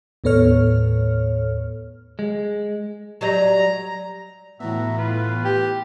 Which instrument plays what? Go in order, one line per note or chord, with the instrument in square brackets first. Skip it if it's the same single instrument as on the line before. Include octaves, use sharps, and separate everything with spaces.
[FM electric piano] D#2 A2 B3 A4 C#5 F6
[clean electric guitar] G#3
[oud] F#3 G3 D#5 [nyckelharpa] A#5
[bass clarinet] A2 [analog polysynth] E3 A3 B3 [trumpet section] F#4 E5 A#5
[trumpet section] F4 B4
[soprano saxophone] G4